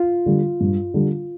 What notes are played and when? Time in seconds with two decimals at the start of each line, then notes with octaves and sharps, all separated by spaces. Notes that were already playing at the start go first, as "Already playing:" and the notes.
Already playing: F4
0.26 D3 G3
0.60 G2
0.94 D3 G3